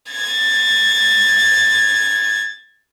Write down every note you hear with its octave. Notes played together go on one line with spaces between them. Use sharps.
G#6 A6